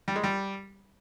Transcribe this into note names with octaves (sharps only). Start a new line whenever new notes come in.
G3
G#3
G3